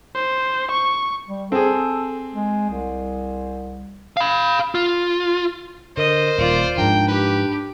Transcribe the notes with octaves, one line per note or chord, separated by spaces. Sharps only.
C5
C#6
G3
C4 G#4 A4
G#3
C2
F5 B5
F4
D3 A#4 C5 D#5
D#1 F4 D5
G#2 F3 D4 A#4 G5
G4 B4